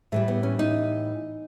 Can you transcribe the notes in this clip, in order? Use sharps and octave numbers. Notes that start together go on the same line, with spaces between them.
A2 E3 G3 A3
B3
C#4
D#4